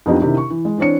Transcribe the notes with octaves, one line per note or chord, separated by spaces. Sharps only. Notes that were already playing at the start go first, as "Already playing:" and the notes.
F2 E3 B3 D4 D#4 G4
C3 D#3 D4 E4 G4
C#6
E3
G#3
E3 C4 D4 C#5 C#7